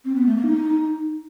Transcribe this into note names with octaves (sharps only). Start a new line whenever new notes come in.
C4
B3
A3
A#3
D#4